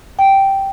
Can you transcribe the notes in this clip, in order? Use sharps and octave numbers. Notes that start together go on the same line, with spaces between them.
G5